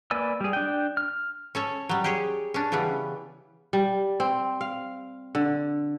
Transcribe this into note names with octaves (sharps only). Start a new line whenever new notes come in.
A#3 B4 D5 G#5 E6
G3 G#4
D4 G5
F6
C#4 A4 C#5
F#3 G3
G4 G#4 C#5
C#4 D4
C#3 E3 G3 B3
G3
C4
F5
D3